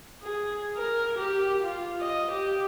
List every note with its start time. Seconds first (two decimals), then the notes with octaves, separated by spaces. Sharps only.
0.23 G#4
0.77 A#4
1.19 G4
1.64 F4
2.01 D#5
2.32 G4